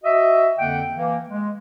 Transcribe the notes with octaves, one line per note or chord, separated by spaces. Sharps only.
F#4 D#5 E5
F2 D3 A#3 F#5 G5
E3 A#3
G#3